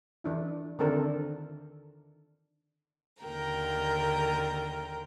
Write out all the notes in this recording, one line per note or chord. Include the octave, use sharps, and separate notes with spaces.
E3 D4 E4
D3 D#3 C4 D4 A4 A#4
D#2 D3 A#4 G5 A#5